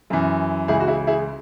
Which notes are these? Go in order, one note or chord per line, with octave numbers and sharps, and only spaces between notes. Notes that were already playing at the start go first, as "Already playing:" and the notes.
F#2 E3
C#2 C#3 E3 E4 G#4
F#4
E4 G#4
E4 G#4